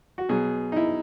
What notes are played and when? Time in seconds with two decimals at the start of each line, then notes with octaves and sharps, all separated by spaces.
0.18 F#4
0.29 B2 F#3 G#4
0.72 D#4
0.76 E4